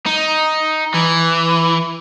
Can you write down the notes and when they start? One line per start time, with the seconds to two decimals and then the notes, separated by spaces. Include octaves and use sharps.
0.06 D#4
0.94 E3